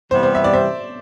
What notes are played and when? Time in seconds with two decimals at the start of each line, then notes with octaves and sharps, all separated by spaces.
0.10 C3 E3 G3 B3 C5
0.23 C5
0.35 E5
0.44 D5
0.53 C5 E5